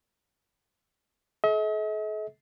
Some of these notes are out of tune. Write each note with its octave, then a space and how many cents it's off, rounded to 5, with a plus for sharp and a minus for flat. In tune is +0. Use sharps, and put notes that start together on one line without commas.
A4 -45 D#5 +45